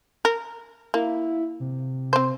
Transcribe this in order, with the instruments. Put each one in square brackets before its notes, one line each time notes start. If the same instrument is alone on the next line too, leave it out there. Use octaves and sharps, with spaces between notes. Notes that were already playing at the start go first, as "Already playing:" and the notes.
[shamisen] A#4
[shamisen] A#3 [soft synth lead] E4
[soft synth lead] C3
[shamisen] C4 C5